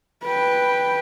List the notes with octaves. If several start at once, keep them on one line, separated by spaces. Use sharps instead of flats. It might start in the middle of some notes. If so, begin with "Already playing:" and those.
B4 G5